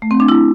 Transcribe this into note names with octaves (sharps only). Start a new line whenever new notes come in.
A3
C4
D4
E4